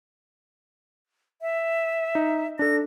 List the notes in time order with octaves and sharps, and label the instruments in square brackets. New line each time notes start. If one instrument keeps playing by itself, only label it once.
[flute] E5
[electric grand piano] D#4
[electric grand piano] D4 A4 [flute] A#6